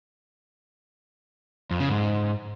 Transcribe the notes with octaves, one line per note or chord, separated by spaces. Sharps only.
F2
C#3
G#2